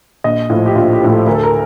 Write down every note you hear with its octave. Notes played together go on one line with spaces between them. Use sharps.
A#1 D#5
A2 F3 F4
G4
A#1 F4
G4
A2 F3
A4
D2 A#4
A4
A#4